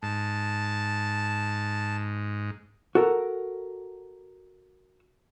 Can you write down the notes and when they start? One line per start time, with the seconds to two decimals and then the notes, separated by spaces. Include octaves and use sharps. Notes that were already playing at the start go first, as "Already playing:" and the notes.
0.03 G#2 A5
2.95 F#4 A4 A#4